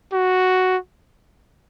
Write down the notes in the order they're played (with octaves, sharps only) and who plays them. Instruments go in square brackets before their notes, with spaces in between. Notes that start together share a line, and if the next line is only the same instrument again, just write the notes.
[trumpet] F#4